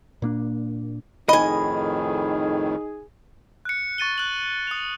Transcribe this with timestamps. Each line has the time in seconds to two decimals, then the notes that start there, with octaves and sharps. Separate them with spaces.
0.22 A#2 A#3 D4
1.29 F2 A2 D#3 D#4 G#4 D#5 G#5 B5
3.65 F#6 C#7
3.98 C#6 A6 D#7 G7
4.18 F#6 F#7
4.67 D#6 F7